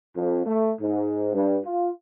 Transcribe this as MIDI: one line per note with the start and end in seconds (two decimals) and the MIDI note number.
0.16 0.44 41
0.46 0.71 57
0.80 1.32 44
1.34 1.58 43
1.65 1.89 65